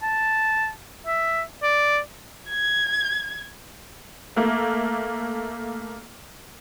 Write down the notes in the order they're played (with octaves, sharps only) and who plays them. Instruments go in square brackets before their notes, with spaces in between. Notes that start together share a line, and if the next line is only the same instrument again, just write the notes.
[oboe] A5
E5
D5
[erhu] G#6
[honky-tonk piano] A3 A#3